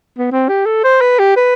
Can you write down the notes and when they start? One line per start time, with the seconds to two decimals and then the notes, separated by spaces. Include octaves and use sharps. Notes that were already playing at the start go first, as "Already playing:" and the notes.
0.18 B3
0.32 C4
0.49 G4
0.66 A4
0.84 C5
1.01 B4
1.19 G4
1.36 B4